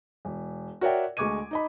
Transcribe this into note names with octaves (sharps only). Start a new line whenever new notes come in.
E1
F#4 A#4 C#5 D5 E5 G5
D2 G#3 C#6 D6 G#6 D#7
D#4 D#5 B5